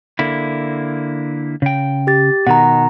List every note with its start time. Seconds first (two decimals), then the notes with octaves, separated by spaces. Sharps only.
0.19 D3 A#3 E4
1.62 C#3 G5
2.07 G4 A6
2.47 B2 D#3 F#5 A#5